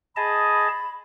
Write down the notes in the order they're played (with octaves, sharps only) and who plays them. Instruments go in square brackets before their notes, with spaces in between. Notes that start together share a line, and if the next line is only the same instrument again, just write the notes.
[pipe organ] G#4 D#5 A5 [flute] B5